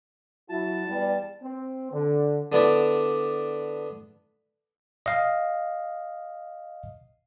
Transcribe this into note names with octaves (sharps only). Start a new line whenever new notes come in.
F#3 E4 F#4 A5
E2 G3
C4
D3
D3 B3 D4 E4
D#5 F5